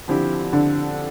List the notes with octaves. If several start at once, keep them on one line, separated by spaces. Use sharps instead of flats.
D3 F3 C4 E4 G4
D3